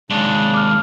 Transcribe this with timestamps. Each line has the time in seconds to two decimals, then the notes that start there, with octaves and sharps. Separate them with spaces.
0.10 D#2 G#2 C#3 D4
0.54 D6 F6